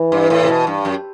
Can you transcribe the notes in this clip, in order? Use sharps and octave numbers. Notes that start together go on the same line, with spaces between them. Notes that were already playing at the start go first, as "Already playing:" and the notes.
Already playing: E3
G2
A2
C3
B2
G2
F#2